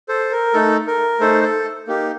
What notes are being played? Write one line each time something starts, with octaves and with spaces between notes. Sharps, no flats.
A4 C5
A#4
A3 D#4 A4
A#4
A3 D#4 A4 C5
A4
A#3 D#4 G4